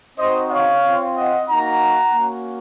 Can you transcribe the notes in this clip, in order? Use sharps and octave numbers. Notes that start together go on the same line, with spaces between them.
C4 D#4 F#4 C5 D#5
C#5 F5
C4 F4
D#5 F#5
A#3 D#4 F#4 F#5 A#5
A#3 C#4 F#4